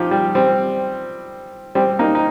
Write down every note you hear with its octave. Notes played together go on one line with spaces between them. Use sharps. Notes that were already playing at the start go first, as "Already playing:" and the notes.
Already playing: F3 D#4 G4
G3
G3 C4
G3 C4
A#3 D#4
D#4